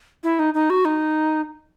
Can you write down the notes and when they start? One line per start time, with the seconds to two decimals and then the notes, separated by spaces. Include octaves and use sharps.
0.24 E4
0.39 D#4
0.54 D#4
0.70 F#4
0.85 D#4